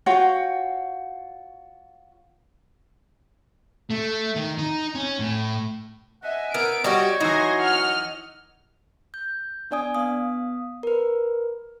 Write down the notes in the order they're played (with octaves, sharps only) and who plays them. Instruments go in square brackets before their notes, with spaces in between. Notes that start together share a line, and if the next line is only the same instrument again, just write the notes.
[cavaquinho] F4 F#4 C#5 G5
[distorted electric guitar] A3
D#3
D#4
C#4
A2
[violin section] D#5 E5 G#5 [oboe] F#5
[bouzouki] B3 [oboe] E4 [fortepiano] A#4 [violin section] D7
[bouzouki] G3 F#4 G4 [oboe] C#5 [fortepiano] D#5
[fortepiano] E3 D#4 [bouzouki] F#3 [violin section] C6 G#6 A#6
[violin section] D#5 F#5 F6
[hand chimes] G6
B3 D4 D5 G#5 D#6
B3 F5 D#6
A#4 B4